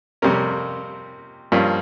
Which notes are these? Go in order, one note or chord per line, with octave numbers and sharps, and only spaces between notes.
F2 C3 G3 A#3 C#4 A#4
G2 F3 A#3 C#4